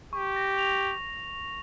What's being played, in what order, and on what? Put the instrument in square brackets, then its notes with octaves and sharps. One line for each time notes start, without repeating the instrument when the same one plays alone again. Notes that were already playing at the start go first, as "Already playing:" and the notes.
[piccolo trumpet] G4 [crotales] C#6
[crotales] A#6
F7